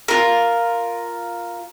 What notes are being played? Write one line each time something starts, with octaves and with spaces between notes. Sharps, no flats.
F4 A#4